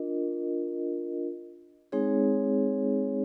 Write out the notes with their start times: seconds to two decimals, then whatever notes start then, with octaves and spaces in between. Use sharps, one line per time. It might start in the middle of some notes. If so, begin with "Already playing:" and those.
Already playing: D4 F4 A#4 D#5
1.92 G#3 C4 D#4 G#4 C#5